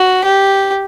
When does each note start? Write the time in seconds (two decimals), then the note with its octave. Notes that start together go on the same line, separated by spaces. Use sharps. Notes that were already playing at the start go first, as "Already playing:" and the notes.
Already playing: F#4
0.24 G4